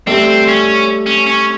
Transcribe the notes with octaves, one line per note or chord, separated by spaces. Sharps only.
G3 A3 C4
C#4
C#4
C#4